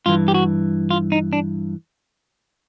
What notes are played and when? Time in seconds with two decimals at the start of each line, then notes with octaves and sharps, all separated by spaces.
0.06 G2 E3 F4
0.28 G4
0.34 F#4
0.91 F4
1.12 D#4
1.33 D4